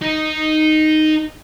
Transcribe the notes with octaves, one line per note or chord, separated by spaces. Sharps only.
D#4